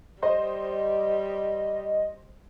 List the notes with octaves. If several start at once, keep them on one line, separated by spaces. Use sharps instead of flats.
G3 C5 D#5